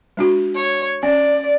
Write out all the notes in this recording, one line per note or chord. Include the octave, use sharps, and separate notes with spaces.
G#3 D4 F#4
C#5
C#4 D5